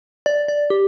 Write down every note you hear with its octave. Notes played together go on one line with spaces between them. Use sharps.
D5
D5
G4